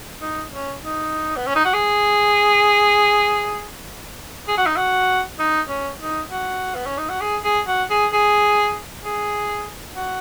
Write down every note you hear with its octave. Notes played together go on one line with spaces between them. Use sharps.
D#4
C#4
D#4
B3
C#4
D#4
F#4
G#4
G#4
F#4
D#4
F#4
D#4
C#4
D#4
F#4
B3
C#4
D#4
F#4
G#4
G#4
F#4
G#4
G#4
G#4
F#4